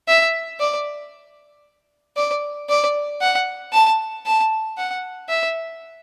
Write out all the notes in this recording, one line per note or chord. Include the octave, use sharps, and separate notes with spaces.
E5
D5
D5
D5
F#5
A5
A5
F#5
E5